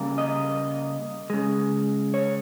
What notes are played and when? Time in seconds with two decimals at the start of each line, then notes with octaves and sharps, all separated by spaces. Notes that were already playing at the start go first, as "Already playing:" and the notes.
Already playing: C#3 G3 A#3
0.18 D#5
1.30 C#3 G#3
2.14 C#5